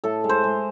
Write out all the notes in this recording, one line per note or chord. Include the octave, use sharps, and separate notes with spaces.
A2 A4
G#3
C5
G#3